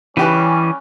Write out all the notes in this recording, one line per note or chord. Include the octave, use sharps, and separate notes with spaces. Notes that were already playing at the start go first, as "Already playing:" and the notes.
C#3 E3 G3 C#4 G4 B4